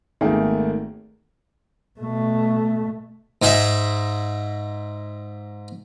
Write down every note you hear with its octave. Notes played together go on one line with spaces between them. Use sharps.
G#1 D#3 A3 A#3 G#4
B2 A3
G#2 D#4 G#4 E5